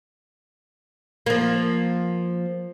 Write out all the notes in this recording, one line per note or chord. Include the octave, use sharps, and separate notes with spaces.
F3 A#3